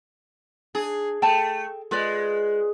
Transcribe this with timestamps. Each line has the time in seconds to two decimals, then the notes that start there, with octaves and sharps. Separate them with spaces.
0.75 D4 G#4
1.22 A3 G5 A5
1.91 G#3 F4 B4 D5